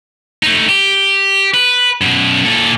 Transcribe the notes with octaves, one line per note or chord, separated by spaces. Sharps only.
A3 D#4
G4
B4
F#2 B2
A#2 A4